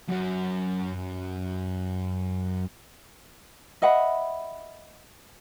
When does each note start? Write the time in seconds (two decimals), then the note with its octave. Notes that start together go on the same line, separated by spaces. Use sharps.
0.09 F#2 F#3
3.82 D#5 E5 F#5 B5